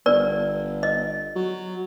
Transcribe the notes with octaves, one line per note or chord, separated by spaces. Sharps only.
G1 A#4 D5
D#5
F#3